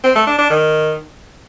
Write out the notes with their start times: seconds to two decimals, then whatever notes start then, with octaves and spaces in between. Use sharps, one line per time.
0.04 C4
0.15 A3
0.27 D4
0.38 D4
0.50 D#3